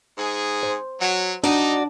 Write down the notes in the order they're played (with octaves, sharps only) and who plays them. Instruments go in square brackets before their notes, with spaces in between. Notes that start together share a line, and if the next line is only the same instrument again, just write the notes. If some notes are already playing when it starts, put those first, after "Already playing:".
[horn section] G#2 G#4
[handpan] C5
[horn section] F#3
[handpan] D4 [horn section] D#4 [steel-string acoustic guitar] F#4 D5